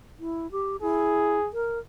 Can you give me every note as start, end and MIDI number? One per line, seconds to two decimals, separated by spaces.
0.19 0.50 64
0.52 0.76 67
0.82 1.39 64
0.82 1.49 68
1.53 1.79 70